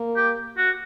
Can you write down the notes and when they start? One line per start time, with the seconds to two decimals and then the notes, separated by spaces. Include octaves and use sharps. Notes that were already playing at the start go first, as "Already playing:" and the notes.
Already playing: A#3
0.16 G4
0.57 F#4